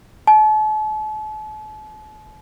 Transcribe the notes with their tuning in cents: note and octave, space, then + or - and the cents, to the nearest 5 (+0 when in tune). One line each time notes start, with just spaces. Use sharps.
A5 -40